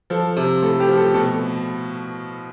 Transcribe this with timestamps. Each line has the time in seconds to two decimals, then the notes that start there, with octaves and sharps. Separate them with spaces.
0.10 F3 A4
0.36 C3
0.62 A2 A4
0.80 G4
0.88 F3
0.97 A4
1.14 B2 A4